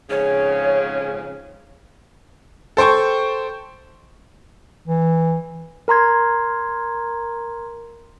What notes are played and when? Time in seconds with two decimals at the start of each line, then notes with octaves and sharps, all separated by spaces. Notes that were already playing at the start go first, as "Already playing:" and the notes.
0.10 F2 G#2 C#3 C#5
2.77 A4 C5 G5 C#6
4.87 E3
5.88 A#4 A#5 C6 G#6